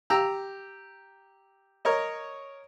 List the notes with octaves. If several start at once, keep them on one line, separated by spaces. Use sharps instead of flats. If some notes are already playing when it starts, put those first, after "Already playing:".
G4 A#5 E6
A#4 C#5 D#5